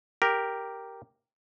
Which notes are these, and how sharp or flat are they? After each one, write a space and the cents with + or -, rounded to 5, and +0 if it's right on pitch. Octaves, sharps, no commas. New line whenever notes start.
G4 +0 A#4 +0